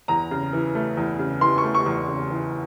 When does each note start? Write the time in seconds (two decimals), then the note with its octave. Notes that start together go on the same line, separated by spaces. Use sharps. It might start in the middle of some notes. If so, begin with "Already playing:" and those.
0.08 E2 A#5
0.31 C#3
0.53 E3
0.75 A3
0.97 E2
1.19 C#3
1.41 E3 C6
1.58 C#6
1.63 A3
1.75 C#6
1.86 E2
2.08 C#3
2.30 E3